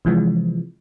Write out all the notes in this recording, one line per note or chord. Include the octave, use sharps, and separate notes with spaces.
C3 E3 F3 G#3